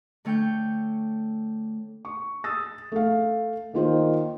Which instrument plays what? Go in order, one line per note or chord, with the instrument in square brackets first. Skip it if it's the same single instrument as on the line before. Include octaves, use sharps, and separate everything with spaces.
[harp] D3 A3 C#5 G5 G6
[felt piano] C#6
D#6 E6 A6
A3 F5
[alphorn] D#3 [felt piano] A#3 F4 C5